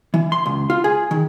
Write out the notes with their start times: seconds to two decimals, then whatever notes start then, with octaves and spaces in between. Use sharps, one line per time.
0.14 E3
0.32 C6
0.46 C#2
0.70 F4
0.84 G#4
1.11 D#3